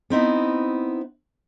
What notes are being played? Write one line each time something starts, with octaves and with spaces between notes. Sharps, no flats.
B3 C4 D#4 E4